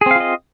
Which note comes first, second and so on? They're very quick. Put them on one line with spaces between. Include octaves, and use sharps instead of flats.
G#4 C4 F5 F4 D#5